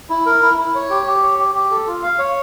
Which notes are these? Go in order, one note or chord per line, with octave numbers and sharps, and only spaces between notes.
E4
A#4
E4
E4
C#5
G4
G4
C#5
G4
G4
A4
F4
F5
C#5